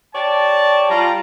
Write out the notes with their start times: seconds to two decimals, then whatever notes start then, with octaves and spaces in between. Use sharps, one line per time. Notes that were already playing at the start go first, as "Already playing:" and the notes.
0.15 G4 C#5 D5 A5
0.90 G3 F4 A#5